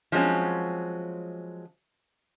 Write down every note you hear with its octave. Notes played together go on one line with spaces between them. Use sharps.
F3 F#3 G#3 C4 C#4